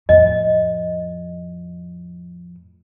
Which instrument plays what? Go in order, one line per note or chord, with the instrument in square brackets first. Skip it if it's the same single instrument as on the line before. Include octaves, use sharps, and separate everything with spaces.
[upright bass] F2 A2 [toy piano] D#5